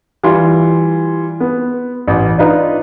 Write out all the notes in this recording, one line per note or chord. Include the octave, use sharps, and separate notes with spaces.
E3 G3 F4 C6
B3
A1
D4 D#4 F4 B4